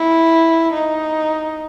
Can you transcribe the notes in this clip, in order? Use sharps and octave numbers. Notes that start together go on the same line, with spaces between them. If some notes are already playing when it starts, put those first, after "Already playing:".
Already playing: E4
D#4